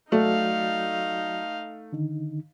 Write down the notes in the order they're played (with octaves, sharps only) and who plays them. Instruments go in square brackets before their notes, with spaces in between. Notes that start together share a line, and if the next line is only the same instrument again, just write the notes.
[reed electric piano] F#3 F#4 D5 [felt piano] A3 [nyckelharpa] D#4 F5
[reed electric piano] D3 D#3 D#4